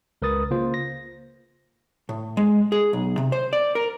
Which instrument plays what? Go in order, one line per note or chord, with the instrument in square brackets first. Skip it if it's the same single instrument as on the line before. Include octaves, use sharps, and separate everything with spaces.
[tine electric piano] C#2 A#4 B4 D#6 A6
C#3 A#3 F4 C5
A#6
[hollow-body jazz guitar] A2
G#3
G#4
B1
C3
C5
D5
A#4